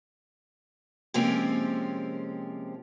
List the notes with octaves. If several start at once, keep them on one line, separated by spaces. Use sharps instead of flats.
C3 F3 G#3 A#3 C4 C#4